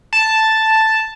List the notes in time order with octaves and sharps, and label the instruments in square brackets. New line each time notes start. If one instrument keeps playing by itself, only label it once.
[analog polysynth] A5